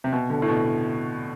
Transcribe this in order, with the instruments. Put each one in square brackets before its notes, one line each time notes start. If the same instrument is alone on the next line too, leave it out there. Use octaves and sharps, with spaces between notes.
[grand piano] C3
B2
D3
A2
B2